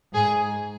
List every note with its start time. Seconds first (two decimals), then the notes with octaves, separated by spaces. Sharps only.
0.13 G#2 G#4